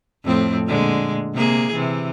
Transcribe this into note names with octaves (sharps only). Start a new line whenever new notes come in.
F2 A2 C4
A#2 D3 G#3
C3 A#3 G#4
C3 E3